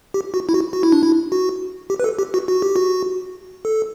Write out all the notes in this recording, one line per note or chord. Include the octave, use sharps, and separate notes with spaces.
G4
F#4
E4
F#4
F#4
E4
D4
E4
F#4
G4
B4
A4
G4
F#4
F#4
G4
F#4
A4